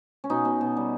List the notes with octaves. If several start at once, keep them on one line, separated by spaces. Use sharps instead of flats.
C#4
B2 D#4
B2
B2
G3